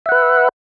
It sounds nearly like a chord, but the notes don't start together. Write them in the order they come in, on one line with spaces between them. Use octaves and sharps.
E5 F#5 B4